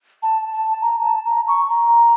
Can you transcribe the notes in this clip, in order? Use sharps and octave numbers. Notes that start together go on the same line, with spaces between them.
A5
A5
A#5
A5
A#5
C#6
A#5